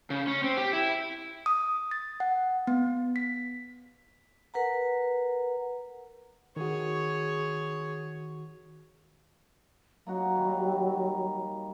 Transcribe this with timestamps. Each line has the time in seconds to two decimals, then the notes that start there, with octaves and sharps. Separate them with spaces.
0.10 C#3
0.27 C#4
0.44 C4
0.57 G4
0.73 E4
1.46 D#6
1.91 A6
2.20 F#5
2.67 B3
3.16 B6
4.54 A#4 B4 F#5 A#5
6.56 D#3 F#4 G#4 C#5
10.07 F#3 A#3 D#4 F#4
10.36 D#3 G3